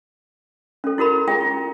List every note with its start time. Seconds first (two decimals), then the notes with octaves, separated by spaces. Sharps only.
0.84 C#4 A4
0.98 E4 F#4 A#4 B5
1.28 F4 G#4 G5
1.41 F4